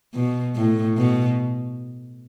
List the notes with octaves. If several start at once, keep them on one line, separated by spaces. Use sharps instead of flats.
B2
A2
B2